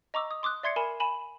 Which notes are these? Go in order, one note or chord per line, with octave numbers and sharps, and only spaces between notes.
D#5 A#5 C#6 D6 E6
D#6
C6 D6 D#6 F#6
D5 E5 C6 G#6 C7 C#7
A#4 G#5 B5 E7
G#5 B5 E7 F#7